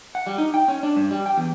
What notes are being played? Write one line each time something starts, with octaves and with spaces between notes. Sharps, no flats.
F#5
G3
D#4
G5
C#4
D4
G2
G3
G5
E2